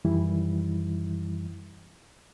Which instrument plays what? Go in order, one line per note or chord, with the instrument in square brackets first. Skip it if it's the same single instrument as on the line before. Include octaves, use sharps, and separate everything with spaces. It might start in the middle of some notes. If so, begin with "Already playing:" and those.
[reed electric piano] F#2 D#3 E3 G3 E4